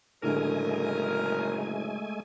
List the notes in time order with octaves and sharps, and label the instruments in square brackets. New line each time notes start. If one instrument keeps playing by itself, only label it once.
[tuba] F#1 [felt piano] A2 D3 [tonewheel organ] G#3 A3 G#5 [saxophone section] A#4